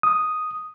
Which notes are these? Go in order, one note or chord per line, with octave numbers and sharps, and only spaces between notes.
D#6